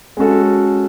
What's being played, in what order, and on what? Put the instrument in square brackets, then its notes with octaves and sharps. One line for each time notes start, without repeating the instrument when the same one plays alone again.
[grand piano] G#3 C#4 F#4 A4